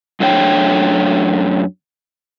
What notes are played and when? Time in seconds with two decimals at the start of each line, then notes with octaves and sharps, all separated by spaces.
0.20 F#2 A3 D4 C#5 G5